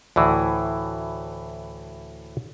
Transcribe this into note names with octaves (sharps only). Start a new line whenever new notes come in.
D2 A2 E3